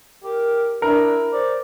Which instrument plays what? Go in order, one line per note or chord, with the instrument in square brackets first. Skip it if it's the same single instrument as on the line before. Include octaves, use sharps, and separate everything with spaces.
[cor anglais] G4 [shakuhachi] A#4
[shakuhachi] D4 [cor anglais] E4 [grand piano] A#4
[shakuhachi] C5 [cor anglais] D5